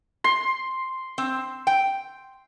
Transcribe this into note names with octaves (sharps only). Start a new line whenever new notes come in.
C6
C4
G5